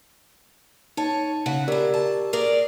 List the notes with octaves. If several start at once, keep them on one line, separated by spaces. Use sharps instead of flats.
D#4 C#5 A5
C#3 F#5
C#3 E4 G4 A#4 D5
A5
G#4 A#4 D5